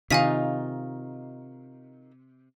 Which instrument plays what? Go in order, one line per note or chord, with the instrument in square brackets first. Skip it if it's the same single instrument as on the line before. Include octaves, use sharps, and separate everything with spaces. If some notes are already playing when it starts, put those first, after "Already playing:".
[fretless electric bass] C3 [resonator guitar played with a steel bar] D#3 D#4 F4 [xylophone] F5 G#5 B6